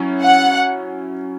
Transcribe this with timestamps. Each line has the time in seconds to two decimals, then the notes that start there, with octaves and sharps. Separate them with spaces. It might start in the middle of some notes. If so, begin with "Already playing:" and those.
Already playing: F#3 C#4 E4
0.23 F#5